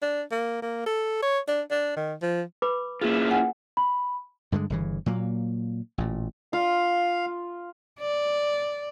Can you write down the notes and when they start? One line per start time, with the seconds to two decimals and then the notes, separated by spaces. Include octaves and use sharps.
0.02 D4
0.31 A#3
0.62 A#3
0.86 A4
1.22 C#5
1.48 D4
1.71 D4
1.96 D#3
2.22 F3
2.62 B4 B5 D6
3.01 A#3 C#4 E4 F4 G#4
3.31 F#5 G#5
3.77 B5
4.52 G2 D3 D#3 G#3
4.70 G1 C#3 E3
5.06 A#2 F#3 A#3
5.98 A1 A#2
6.53 F4 F5
8.00 D5